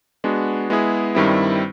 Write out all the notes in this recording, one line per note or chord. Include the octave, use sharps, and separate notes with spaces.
G#3 B3 D4 F#4
G#3 B3 E4 G#4
G2 D#3 G3 C4 E4